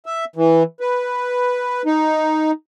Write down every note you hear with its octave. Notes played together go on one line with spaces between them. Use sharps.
E5
E3
B4
D#4